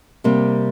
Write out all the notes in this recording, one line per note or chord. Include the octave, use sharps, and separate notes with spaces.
C3 G3 A#3